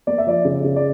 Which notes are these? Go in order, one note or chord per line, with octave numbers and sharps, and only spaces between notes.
A#3 D5
E5
F3 D5
C#3
C#3
D5